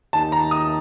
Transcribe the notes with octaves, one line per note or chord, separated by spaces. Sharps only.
D#2 D#3 A#3 D#4 G4 A5
A#5
D#6